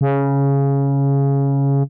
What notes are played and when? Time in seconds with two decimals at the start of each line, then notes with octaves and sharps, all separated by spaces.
0.01 C#3